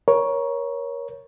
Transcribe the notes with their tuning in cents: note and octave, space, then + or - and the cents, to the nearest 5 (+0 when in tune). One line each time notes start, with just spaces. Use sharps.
A#4 +25 C#5 +0